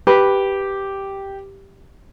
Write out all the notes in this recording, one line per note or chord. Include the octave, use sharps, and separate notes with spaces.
G4 B4